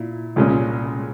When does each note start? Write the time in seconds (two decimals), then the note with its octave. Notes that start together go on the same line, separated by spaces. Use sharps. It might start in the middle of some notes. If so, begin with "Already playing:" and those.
Already playing: A#2 E4
0.36 C2 A#2 G#3 C#4